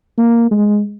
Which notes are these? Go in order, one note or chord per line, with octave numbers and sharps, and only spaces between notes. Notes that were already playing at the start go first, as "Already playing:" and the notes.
A#3
G#3